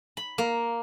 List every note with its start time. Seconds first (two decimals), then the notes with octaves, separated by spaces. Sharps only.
0.17 B5
0.38 A#3